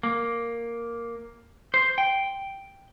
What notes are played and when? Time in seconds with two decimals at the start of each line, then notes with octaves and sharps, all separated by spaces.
0.03 A#3
1.74 C5
1.98 G5